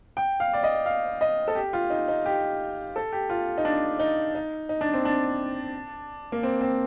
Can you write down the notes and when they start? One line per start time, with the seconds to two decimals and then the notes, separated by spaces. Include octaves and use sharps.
0.17 G5
0.40 F5
0.53 D5
0.63 D#5
0.86 F5
1.21 D#5
1.48 A4
1.55 G4
1.73 F4
1.90 D#4
2.08 D#4
2.26 G4
2.96 A4
3.12 G4
3.30 F4
3.58 D#4
3.65 D4
3.99 D#4
4.35 D#4
4.69 D#4
4.81 D4
4.93 C4
5.05 D4
6.32 A#3
6.43 C4
6.61 C4